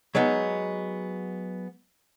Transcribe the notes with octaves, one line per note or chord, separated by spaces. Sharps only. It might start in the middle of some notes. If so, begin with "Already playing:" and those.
F#3 G#3 B3 D#4